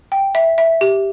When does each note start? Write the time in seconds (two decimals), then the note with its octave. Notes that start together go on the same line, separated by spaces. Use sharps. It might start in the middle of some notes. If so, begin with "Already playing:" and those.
0.12 G5
0.35 E5
0.58 E5
0.81 G4